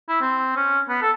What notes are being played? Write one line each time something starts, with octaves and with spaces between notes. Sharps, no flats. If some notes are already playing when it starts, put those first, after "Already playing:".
E4
C4
C#4
B3
A4